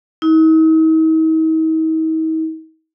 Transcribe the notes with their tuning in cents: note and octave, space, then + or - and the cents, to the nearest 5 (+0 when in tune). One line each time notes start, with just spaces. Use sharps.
D#4 +45